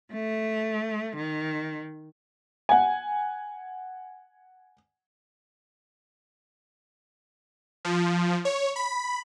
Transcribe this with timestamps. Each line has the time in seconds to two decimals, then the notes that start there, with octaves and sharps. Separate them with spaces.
0.14 A3
1.17 D#3
2.69 F#5 G#5
7.85 F3
8.45 C#5
8.76 B5